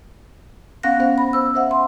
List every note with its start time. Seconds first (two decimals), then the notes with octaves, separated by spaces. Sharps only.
0.83 B3 C#4 F5 F#5 F#6 A#6
0.99 B3 C5 F5
1.18 B5
1.33 C5 E6
1.55 C5 E5 F#5
1.71 C6